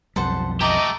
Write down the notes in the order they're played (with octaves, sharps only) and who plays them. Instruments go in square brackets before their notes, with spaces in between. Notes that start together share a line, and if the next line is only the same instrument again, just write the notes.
[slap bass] B1 F2 G3 [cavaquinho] A4 C5 F#5
[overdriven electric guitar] A3 G4 [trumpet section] D#5 D6 [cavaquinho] A#5